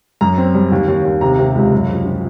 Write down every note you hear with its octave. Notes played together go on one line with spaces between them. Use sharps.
F#2 A#5
C4
G3
D#2
D#2
D#2
C3 A#5
C3
C#2
F#2
F3
F3